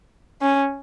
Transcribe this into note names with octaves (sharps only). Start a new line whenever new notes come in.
C#4